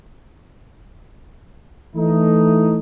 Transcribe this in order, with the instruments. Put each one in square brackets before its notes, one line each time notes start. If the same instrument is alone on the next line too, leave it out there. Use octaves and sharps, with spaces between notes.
[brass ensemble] E3 A3 D#4